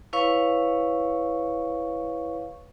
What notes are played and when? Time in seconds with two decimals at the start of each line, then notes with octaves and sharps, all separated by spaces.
0.13 E4 B4 C#5 F5 C#6